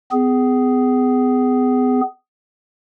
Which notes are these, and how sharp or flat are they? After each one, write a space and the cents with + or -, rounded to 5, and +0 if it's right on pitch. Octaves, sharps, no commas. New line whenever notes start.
B3 +40 G#4 +0